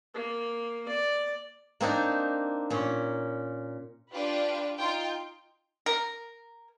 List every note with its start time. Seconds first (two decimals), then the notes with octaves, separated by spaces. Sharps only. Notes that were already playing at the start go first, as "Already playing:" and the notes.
0.15 A#3
0.88 D5
1.80 A#3 C4 D4 D#4
2.70 A#2 C#4
4.12 D4 F4 G4 B4
4.78 D#4 F4 G5
5.86 A#4